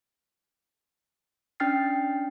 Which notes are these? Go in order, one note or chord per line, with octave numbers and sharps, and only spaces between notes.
C#4 D4 G5 F6 A6 C7